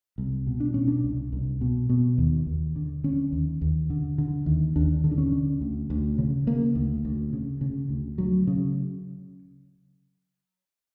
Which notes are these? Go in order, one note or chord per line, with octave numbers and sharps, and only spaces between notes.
C2
B2
D4
B2 C#4
D4
C2
C2
B2
B2
D#2
D#2
D3
D3 C#4
D#2
D#2
D3
D3
D#2
D#2 D4
D3
D4
C#4
D3
D2
D2
C#3
C#3 A#3
D2
D2
C#3
C#3
D2
D2 F#3
C#3